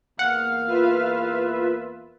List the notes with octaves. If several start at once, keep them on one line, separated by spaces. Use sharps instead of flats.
E2 A#3 F5 F#5
F4 B4 E5